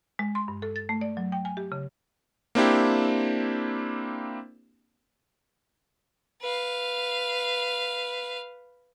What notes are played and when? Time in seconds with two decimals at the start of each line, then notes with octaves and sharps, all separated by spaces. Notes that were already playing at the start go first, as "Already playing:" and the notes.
0.19 G#3
0.35 C6
0.48 G2
0.62 A4
0.76 A6
0.89 A3
1.01 D5
1.17 F#3
1.32 G5
1.45 G#5
1.57 G4
1.72 C#3
2.55 A#3 C4 D4 E4 G4
6.42 B4 F5